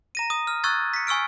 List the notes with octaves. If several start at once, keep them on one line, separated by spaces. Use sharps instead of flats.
A#5 A#6 D#7
D#6
F6
C#6 E6 F#6 G#6 A6
B6 C#7
G#5 C#6 E6 F6 D7